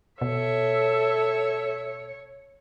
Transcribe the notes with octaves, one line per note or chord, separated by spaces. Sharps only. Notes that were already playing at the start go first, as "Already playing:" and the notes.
B2 A4 C#5 E5